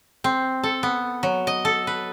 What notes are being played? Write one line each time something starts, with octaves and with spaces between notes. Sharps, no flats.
C4
A4
B3
F#3
D#5
A4
B4